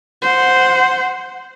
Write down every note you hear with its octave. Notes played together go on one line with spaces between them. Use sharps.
C5 F#5